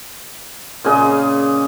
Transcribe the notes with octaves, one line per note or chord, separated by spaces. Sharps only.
A#2 C#3 G#4 D#5